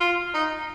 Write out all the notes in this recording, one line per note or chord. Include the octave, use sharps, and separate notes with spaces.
F4
D#4